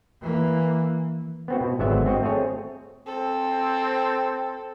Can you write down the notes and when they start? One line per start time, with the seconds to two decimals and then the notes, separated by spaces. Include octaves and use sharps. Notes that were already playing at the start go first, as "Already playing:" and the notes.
0.21 E3 A#3
1.48 B3 C4 F#4
1.61 B2
1.79 G#1 D3 F#3 G#3 B3 E5
2.06 C4 F#4 D#5
2.22 A3 C4 G#4 C#5
3.08 C4 A4